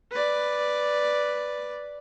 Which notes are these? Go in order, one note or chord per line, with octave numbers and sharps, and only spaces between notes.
B4 D5